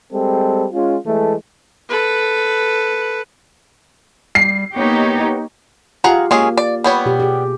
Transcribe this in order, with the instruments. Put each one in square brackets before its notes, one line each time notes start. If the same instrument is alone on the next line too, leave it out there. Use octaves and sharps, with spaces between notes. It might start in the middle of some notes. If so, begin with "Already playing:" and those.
[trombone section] G3 G#3 C4 A4
G#3 C#4 F4
E3 G#3 A3
[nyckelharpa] A4 B4
[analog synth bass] G3 [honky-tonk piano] C7
[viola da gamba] A#3 [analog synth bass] B3 [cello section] D#4 G4 C#5
[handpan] F4 G4 F5 [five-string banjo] G#4 F#5 A#5
[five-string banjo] G#3 C#4 G#4 [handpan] A#3
[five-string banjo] D5
G3 B3 C#5
[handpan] B2 G4
G4 G#4